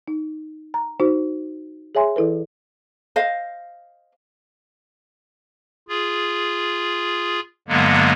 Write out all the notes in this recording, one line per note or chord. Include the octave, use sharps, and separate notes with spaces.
D#4
A#5
D#4 F#4 C5
G#4 C#5 E5 G#5 C6
E3 E4 A4 B4
C5 D#5 F5
F4 G#4
G2 D3 F#3 G#3 A#3 B3